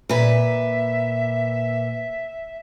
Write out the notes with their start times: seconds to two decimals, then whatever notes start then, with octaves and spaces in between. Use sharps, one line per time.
0.09 A#2 B4 E5